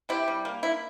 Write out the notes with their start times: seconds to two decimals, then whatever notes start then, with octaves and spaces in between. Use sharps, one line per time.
0.09 C3 E4 G4
0.28 G3
0.45 A#3
0.63 E4